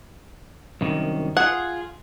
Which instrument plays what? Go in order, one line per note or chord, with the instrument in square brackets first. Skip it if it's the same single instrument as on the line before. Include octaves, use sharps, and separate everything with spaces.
[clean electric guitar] C2 F#2 D#3
[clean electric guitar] F4 G#4 [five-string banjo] F#5